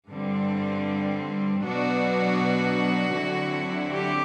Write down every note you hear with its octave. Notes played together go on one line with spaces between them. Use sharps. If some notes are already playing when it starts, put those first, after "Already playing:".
G2 D3 G3 C4
B2 F#3 B3 D4 F#4
D3 F#3 C4 E4
G4